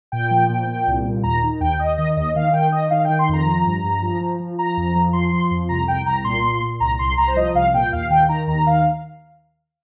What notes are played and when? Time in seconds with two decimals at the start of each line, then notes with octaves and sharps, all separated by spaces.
0.12 A#2 G5
0.31 F3
0.49 A#2
0.68 A#2
0.87 C2
1.05 A#2
1.23 D#2 A#5
1.43 D#3
1.61 D#2 G5
1.79 D#2 D#5
1.98 D#3 D#5
2.17 D#2 D#5
2.36 D#3 F5
2.53 D#3 G5
2.72 D#3 D#5
2.90 D#3 F5
3.05 D#3 G5
3.19 C6
3.29 F2 A#5
3.46 F3
3.65 G2
3.84 G2
4.02 F3
4.21 F3
4.40 F3
4.59 F3 A#5
4.77 F2
4.95 F3
5.13 F3 C6
5.33 F3
5.51 F2
5.69 C2 A#5
5.88 C2 G5
6.06 C2 A#5
6.24 A#2 C6
6.44 A#2
6.62 A#2
6.80 C2 A#5
6.99 C2 C6
7.17 C2 A#5
7.28 C5
7.36 F3 D#5
7.54 C2 F5
7.74 A#2 G5
7.92 D#2 F5
8.10 D#3 G5
8.29 D#3 A#5
8.47 D#2 A#5
8.67 D#3 F5